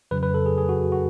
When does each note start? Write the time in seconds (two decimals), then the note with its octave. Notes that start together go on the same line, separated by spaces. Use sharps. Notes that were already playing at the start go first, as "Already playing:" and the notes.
0.11 F2 C#3 F#3 B4
0.23 B4
0.34 A4
0.46 G#4
0.58 G#4
0.69 F#4
0.92 F#4